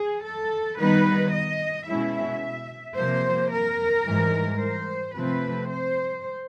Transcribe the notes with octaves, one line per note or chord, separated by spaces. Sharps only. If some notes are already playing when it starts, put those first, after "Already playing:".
Already playing: G#4
A4
D#3 G3 B3 D#4 B4
D#5
B2 G#3 C#4 E4 E5
C3 F3 A#3 C5
A#4
G#2 E3 G3
C5
C3 F3 A3 C4 B4
C5